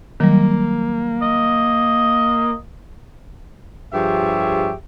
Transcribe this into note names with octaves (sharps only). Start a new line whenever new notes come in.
D#3 F#3 G3 A#3
D#5
G2 F3 G4 G#4 C#5 E5